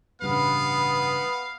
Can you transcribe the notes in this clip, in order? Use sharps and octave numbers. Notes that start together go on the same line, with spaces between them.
A1 G2 C#3 B3 B4 F5